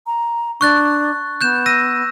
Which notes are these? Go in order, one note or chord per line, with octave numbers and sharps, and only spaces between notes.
A#5
D4 C#6 F#6 A6
B3 F#6 G6 E7
E6 A#6 D#7